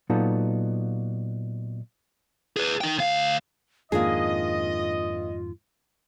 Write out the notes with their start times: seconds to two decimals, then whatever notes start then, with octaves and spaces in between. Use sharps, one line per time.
0.10 A#2 F#3 B3 D#4 F4 A4
2.57 G#4 B4
2.81 D#4 G5
2.98 D2 F5
3.92 F2 G#2 D#3 A#3 D4 F4 G#4 D#5